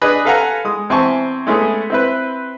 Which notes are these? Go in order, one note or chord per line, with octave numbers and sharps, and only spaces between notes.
D4 G#4 B4 D#5
A4 B4 F5 F#5 G#5 A#5
G#3 D#6
E2 C4 E4 G#5 A5 C#6
G#3 A3 B3 C#4 G#4
C4 E4 B4